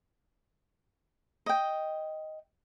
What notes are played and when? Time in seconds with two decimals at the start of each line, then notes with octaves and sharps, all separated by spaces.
1.46 D#5 G5